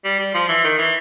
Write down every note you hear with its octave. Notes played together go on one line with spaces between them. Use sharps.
G3
G3
F3
E3
D#3
E3